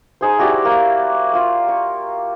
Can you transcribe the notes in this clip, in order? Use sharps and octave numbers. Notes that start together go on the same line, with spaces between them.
D#4 G#4 C5
E4 F#4 G4 D5
A#3
F4 A#4
C#6